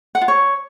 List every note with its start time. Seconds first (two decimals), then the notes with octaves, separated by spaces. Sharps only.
0.15 F#5
0.21 F4
0.28 C#5